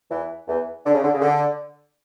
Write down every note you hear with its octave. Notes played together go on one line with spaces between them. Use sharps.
E2 E3
E2 E3
D3
C#3
D3
C#3
D3